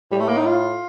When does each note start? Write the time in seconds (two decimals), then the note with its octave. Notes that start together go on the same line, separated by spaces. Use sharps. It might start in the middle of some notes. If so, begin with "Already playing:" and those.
0.12 A2 G3
0.20 A3
0.29 A#3
0.37 D#4
0.46 F4